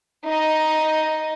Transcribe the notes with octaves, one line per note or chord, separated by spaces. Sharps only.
D#4 D#5